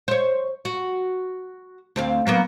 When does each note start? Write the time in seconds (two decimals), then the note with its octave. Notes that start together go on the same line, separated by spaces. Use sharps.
0.08 C5 C#5
0.65 F#4
1.96 D2 C4 F5
2.27 F#3 A#3 B3